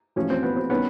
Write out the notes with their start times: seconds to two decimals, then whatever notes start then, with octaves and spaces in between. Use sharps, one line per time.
0.16 A1 A2 F3 A3 C#4
0.30 C4
0.43 B3
0.56 C4
0.70 D#3 G3 B3 C#4